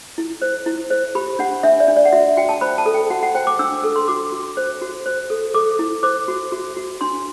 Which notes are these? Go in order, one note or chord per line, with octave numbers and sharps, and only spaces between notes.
E4
C5
E4
C5
G4 B5
D4 F#5
D4 E5
D5
D4
D5
F#5
F#4 E5
F#4 G5
A5
C5 B5
A5
A4
G5
F#4 F#5
F#5
C5 G5
D6
D4 E6
A4
C6
F#4 D6
F#4
C5
F#4
C5
A4
A4 D6
E4
C5 D6
F#4
F#4
F#4
D4 C6